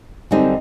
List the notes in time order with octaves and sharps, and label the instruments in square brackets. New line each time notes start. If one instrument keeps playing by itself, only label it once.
[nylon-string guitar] F#2 D3 G3 C4 D#4